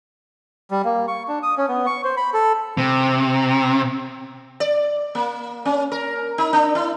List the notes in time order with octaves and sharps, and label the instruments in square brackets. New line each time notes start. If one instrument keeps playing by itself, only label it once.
[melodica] G3
A#3
C#6
D4
D#6
C#4
B3
C#6
C5
B5
A4
[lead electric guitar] C3
[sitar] D5
A#3
C#4
A#4
D#4
D4
E4